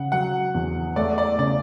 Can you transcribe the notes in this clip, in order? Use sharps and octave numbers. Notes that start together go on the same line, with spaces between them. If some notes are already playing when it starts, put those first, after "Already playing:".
Already playing: C#3 F#5
F#3 F#5
E2
A3 D5
D5
C#3 D5